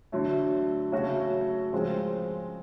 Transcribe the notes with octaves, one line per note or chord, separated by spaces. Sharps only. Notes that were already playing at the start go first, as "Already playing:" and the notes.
D3 F#3 A3
C#3 F#3 A3 C#4 F#4
C#3 F3 G#3 C4 F4